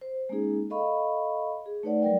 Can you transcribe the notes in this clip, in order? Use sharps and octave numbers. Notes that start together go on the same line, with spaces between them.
C5
G#3 A#3 C#4 D#4 G#4
A4 D#5 F5 B5 C#6
G#4
A3 D#4 B4 C#5 D5 F#5
F#3 G3 A#4 D5 G5